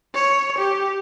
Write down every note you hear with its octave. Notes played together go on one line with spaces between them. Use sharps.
C#5
G4